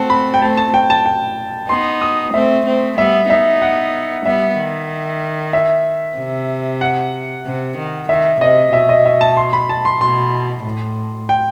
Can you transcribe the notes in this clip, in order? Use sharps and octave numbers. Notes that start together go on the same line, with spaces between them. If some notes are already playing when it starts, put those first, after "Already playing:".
Already playing: A3 C4 F#5 A5
B5
G5
A3 C4 A5
A5
G5
A5
G5
B3 D#4 C6
D#6
A3 C4 E5
A3 C4
G3 B3 E5
B3 D#4 E5
F#5
G3 B3 E5
D#3
E5
C3
F#5
C3
D#3
D#3 E5
C3 D#5
B2 E5
D#5
E5
A5
C6
B5
A5
C6
B2 C6
A2
G5